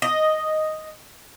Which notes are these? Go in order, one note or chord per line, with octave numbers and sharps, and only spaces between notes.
D#5